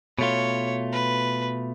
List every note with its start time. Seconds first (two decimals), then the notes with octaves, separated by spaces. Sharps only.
0.18 B2 A3 F4 C#5
0.92 B4